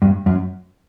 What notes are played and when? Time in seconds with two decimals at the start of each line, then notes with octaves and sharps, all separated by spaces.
0.02 G2
0.26 F#2